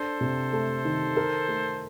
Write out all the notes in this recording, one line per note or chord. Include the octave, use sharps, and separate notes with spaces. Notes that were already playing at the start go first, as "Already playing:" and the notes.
Already playing: D4 A4 C5
C3
A3
D#3
A#4
A3